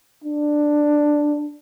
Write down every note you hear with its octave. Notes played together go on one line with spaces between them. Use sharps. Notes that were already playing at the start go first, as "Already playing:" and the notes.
D4